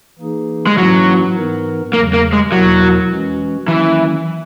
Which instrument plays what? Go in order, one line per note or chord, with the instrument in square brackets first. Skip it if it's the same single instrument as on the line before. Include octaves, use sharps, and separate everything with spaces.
[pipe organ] E3 A#3 D#4 G#4
[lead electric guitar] G#3
[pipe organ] G#2 E3 A#3 C#4 E4 [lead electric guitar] F#3
[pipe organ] G#2 E3 B3 D#4 A#4
[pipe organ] E2 C#3 F#3 [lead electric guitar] A#3
[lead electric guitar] A#3
G#3
[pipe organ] E2 B2 A#3 E4 A#4 [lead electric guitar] F#3
[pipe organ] E3 G#3 C#4 F#4
[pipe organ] D#3 F#3 A#3 C#4 [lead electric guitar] E3